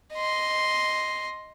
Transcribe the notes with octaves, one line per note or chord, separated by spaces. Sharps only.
D#5 C6